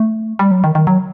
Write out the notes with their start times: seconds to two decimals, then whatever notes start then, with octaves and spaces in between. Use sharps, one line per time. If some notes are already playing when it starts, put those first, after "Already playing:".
Already playing: A3
0.39 G3
0.51 F#3
0.64 D#3
0.75 D#3
0.87 F#3